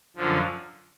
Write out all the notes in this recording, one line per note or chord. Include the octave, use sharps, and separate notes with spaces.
F#2 D3 F3